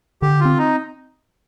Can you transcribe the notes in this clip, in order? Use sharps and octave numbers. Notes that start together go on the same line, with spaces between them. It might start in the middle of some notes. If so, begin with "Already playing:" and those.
D3 G4
F4
C4
D#4